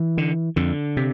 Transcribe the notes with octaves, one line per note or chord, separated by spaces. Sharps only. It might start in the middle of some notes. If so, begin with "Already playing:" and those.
Already playing: E3
D3
F2 D3
C3